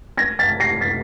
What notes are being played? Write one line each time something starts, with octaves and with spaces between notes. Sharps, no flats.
G#6 A#6
A6 B6
A#6 C7
A6 B6